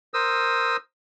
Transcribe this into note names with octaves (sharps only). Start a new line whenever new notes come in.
A#4 C5 D#6 E6